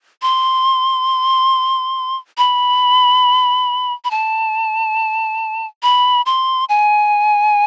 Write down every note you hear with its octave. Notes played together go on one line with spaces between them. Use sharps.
C6
B5
B5
A5
B5
C6
G#5